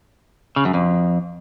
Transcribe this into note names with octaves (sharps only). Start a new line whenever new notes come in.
C#3
F#2
F2